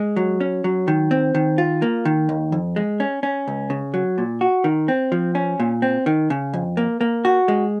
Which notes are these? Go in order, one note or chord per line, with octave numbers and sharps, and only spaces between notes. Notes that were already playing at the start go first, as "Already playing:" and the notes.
Already playing: G#3
F#3
C#4
F#3
D#3
C4
D#3
F4
A#3
D#3
D#2
F2
G#3
C#4
C#4
C#2
C#3
F#3
A#2
F#4
D#3
C4
F3
C#4
A#2
C4
D#3
C#3
F2
A#3
A#3
F#4
G#3